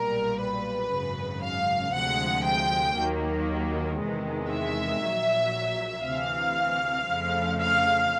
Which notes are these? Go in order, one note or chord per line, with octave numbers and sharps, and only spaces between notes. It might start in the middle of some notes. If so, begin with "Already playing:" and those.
Already playing: B1 A#2 G3 A#4
B4
G#1 F#2 C#3
F5
D2 C3 F3 G#3 F#5
G5
D#2 D#3 F#3 A#3
E2 C3 D#3 G#3
E5
A#1 A#2 F#3
D2 C3 E3 F5
F2 C#3 F3 A3
F5